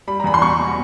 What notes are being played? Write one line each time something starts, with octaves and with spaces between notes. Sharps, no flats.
G3 B5
A#5
E2 B5
C6
B2 C#6
B2